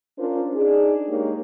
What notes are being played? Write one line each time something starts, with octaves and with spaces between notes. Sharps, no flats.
C#4 D4 F4 A#4 C5
D4 D#4 G#4
G#3 A#3 D#4 G4 C#5